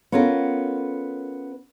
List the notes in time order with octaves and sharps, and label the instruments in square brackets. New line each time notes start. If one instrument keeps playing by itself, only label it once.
[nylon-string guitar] B3 C#4 F4 A4 A#4